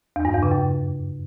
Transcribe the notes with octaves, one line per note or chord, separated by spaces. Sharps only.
E2
G2
E2
C#3
F#2